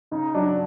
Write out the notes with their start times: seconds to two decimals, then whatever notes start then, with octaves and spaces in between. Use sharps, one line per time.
0.11 C#3 D#4
0.34 F#3 D4